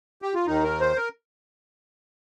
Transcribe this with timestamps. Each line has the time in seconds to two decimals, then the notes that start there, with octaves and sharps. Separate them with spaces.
0.22 G4
0.34 F4
0.46 D#2 D#3 D#4
0.63 A#4
0.80 C5
0.96 A#4